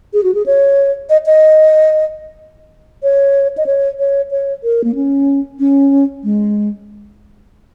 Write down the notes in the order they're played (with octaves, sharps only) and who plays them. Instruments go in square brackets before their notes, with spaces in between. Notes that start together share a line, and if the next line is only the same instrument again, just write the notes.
[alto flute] G#4
F#4
G#4
C#5
D#5
D#5
C#5
D#5
C#5
C#5
C#5
A#4
A#3
C#4
C#4
G#3